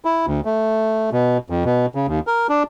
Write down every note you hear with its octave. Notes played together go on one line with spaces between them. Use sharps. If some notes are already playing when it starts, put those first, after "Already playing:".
E4
D2
A3
B2
F2
B2
C#3
D#2
A#4
D4